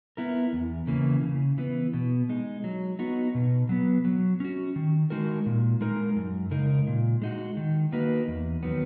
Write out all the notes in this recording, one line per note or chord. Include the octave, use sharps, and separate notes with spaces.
B3 E4 A#4
E2
C#3 E3 A#3
C#3
E3 B3
B2
G#3 D#4
F#3
B3 D#4 F#4
B2
F#3 B3
F#3
C#4 F#4
D#3
G#3 D#4 F#4 A#4
A#2
G#3 D#4 A#4
F#2
C#3 G#3 D#4 A#4
A#2
G#3 D#4 F#4
D#3
A#3 D#4 F#4 B4
E2
D#3 F#3 B3